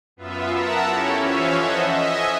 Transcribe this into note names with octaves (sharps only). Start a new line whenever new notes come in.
F#2 B3 F4 E5
A#4 E5 F#5 A5 A#5
C#4 E4 G4 A4 C#5
E3 F3 C#4 C#5 E5 F5
A4 C5 D#5 E5 F#5
D#5 E5 G#5